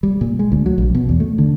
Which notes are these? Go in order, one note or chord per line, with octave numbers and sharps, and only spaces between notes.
G3
A#2
G#3
D2
F#3
A#1
B2
E2
A3
D3